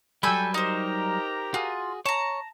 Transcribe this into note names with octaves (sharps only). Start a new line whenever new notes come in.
F#3 G3 A4 G5 G#5 B5 E6 G6
D#4 G4 A#4 C5 A#5
F4 F#4 G#4
C#5 A5 A#5